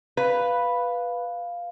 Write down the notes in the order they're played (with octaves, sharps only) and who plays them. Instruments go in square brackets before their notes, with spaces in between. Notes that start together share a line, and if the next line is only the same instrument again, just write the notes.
[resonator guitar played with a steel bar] B4 [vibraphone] F5